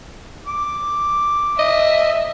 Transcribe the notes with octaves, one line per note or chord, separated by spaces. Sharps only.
D6
D#5 E5